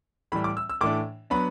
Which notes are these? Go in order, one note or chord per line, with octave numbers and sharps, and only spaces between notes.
A2 E3 G3 B5
D6
E6
E6
A2 E3 A3 D4 D6
F#3 B3 D4 B5